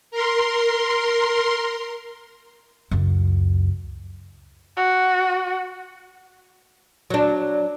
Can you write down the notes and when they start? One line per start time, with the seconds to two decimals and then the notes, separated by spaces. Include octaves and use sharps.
0.11 A#4 C6
2.91 C#2 F#2
4.77 F#4
7.10 F#3 D4